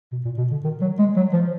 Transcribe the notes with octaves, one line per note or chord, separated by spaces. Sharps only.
B2
A#2
B2
D3
D#3
F#3
G#3
F#3
F3